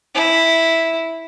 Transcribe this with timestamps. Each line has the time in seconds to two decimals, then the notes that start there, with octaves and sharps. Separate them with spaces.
0.15 E4